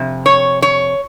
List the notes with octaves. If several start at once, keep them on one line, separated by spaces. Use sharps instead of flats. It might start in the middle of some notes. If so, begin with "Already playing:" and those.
Already playing: F2 C3
C#5
C#5